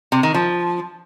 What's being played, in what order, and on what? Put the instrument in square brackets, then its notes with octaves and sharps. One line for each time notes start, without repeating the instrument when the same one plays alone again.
[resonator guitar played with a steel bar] C3
D#3
F3